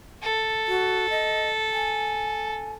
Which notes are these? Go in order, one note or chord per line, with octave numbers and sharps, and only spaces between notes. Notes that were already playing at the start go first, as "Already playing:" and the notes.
A4
F#4
D#5
G#5